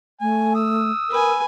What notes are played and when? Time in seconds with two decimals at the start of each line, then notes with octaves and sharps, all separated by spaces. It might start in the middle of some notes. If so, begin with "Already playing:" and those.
0.21 A3 G#5
0.55 D#6 E6
1.10 A#4 B4 G#5